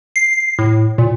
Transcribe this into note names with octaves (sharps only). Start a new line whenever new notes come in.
C7
A2
A#2